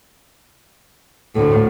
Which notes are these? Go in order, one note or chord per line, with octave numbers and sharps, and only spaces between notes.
D2 A2 A4